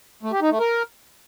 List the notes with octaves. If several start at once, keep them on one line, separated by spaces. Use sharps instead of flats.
A3
G4
D#4
A3
A#4